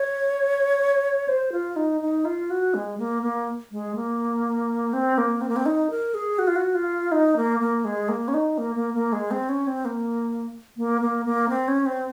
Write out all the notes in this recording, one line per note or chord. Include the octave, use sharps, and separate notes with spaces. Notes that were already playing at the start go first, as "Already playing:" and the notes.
Already playing: C#5
C5
F4
D#4
D#4
F4
F#4
G#3
A#3
A#3
G#3
A#3
C4
A#3
C4
A#3
C4
D#4
A#4
G#4
F#4
F4
F#4
F4
D#4
A#3
A#3
G#3
A#3
C#4
D#4
A#3
A#3
A#3
G#3
C4
C#4
C4
A#3
A#3
A#3
A#3
C4
C#4
C4